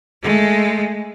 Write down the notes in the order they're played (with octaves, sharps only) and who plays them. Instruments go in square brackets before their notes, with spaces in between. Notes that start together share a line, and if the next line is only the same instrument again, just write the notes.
[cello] G#3 A3